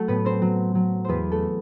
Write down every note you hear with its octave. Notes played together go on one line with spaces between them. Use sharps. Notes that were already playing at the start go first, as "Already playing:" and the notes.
Already playing: F#3 A3 A4
A2 B3 B4
C4 C5
F#3
F#3
E2 B3 B4 C5
A3 A4